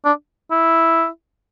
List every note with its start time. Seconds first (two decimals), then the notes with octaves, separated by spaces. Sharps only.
0.05 D4
0.51 E4